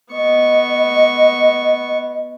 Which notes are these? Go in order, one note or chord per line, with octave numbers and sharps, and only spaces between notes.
B3 D#5 C#6